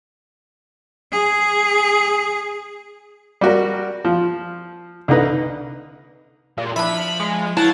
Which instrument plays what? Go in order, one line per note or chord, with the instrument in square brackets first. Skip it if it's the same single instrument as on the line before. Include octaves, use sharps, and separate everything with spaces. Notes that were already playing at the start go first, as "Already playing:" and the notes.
[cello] G#4
[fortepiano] G3 F#4 A#4
F3
C2 D3 D#4 B4
[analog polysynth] A#2 [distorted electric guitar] G3 G#3
[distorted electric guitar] F3 [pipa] D4 E4 [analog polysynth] B5
[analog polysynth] G#3
[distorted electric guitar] B3 [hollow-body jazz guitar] E4 C#5 A5 [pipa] F#4 [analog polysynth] F5 F#5